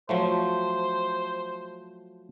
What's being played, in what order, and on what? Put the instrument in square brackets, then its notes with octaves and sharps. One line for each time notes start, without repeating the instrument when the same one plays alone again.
[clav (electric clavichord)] F3 F#3 A3 [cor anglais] C5